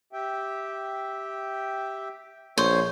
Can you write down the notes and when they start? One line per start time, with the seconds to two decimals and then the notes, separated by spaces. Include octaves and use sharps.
0.13 G4 E5 G5
2.58 A#1 C5 C#5